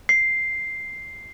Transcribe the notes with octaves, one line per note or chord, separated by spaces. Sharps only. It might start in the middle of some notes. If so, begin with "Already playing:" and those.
C7